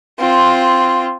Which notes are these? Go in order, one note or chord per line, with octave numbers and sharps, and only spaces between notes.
C4 F4